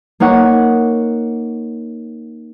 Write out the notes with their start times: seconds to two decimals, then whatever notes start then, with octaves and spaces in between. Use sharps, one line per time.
0.20 A#3 D#4 C#5 F#5